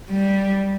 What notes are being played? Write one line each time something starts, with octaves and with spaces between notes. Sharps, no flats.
G3